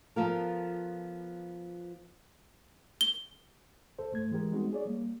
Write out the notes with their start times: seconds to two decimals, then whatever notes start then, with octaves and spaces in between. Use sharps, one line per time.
0.16 F3 B3 F4 A4 A#4
3.01 G7
3.99 C#2 A4 C5
4.12 G#2 A3 G#6
4.31 E3 G#3 G4 A#4
4.52 G3 G#3 B3 C4 D#4 F#4
4.73 G#4 C#5 D5
4.86 G3 A#3